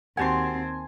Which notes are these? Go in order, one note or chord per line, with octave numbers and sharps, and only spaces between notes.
D#2 C4 F#4 G4 F#5 G#5 A5 C6